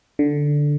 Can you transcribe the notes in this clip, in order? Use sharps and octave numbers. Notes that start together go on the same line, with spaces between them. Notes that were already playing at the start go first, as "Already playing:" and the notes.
D3